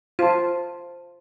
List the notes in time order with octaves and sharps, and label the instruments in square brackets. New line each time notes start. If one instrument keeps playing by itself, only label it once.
[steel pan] F4 [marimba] C5 A5